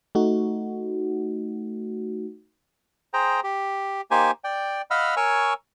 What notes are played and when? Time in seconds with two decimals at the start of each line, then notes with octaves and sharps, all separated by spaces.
0.15 A3 D#4 F#4
3.14 G#4 C5 G5 A#5
3.43 G4
4.11 A#3 D#4 G4 C5 G#5
4.44 D5 G5
4.91 D#5 F5 F#5 B5 E6 F6
5.17 A#4 C#5 G#5 C#6 E6